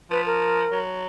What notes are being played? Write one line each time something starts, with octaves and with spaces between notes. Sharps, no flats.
F3 B4
A#4
F#3